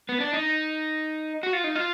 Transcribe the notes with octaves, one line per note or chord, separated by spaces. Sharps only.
B3
D4
D#4
F#4
F4
D#4
F4